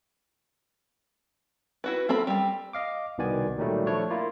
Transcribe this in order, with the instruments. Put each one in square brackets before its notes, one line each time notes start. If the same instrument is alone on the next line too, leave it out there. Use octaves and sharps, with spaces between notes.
[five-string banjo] E4 F#4 B4
A#3 C4 A4 B5
G3 C4
[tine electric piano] D#5 F5 D6
C2 B2 D#3 B3 D5 G#5
A#2 D#3 F#3 G3 A3
F3 A3 D4 E4 C#5
A#3 E4 F4